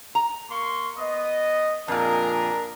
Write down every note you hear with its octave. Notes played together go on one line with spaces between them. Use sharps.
A#5
A#3 C6 C#6
B3 D#5
F2 A#2 D4 G#4 A#4